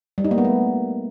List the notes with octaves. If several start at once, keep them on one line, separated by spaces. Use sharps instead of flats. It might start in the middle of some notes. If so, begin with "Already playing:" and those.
G3
D#4
A#3
B3
A3